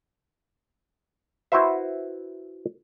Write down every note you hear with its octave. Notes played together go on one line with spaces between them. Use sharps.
E4 F#4 B4 C5 E5